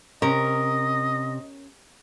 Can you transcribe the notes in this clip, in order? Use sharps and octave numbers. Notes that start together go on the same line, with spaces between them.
C3 C#4 A#4 D#5